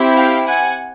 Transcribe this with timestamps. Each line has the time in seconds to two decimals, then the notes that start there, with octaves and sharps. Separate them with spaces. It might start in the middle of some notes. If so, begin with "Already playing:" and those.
Already playing: C4 E4 G4
0.17 F5 G5
0.47 F#5 G#5